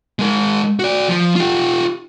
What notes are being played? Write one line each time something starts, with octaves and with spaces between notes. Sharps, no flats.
G#3 A#4
F#4 D5
F3
F4 G4